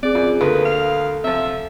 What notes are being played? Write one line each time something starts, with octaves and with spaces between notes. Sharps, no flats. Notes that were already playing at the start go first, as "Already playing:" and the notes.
C4 G#4 D5
F#2 F4
D2 A#3 A4 B4
F5
C3 F3 E5